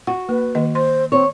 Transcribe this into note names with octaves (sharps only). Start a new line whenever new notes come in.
F#4 F#5
A#3 B4
D#3 A#3 D#5
C5 C6
C4 C#5